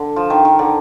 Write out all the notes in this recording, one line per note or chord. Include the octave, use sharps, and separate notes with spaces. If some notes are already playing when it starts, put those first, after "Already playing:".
Already playing: D3
F3
D#3
D#3
D3